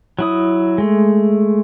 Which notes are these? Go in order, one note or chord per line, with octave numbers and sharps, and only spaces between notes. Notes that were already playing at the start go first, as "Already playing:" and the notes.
F#3 E4 D#6
G#3 A3